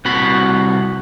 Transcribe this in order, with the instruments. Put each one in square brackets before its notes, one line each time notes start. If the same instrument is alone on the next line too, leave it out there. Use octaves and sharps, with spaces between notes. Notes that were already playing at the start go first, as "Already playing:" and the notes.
[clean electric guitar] C2 F#4 B5